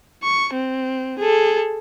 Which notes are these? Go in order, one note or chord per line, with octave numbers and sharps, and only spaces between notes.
C#6
C4
G#4 A4